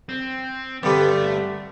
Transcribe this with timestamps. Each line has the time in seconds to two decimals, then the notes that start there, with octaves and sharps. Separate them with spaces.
0.09 C4
0.83 G2 D3 G3 B3
1.09 A3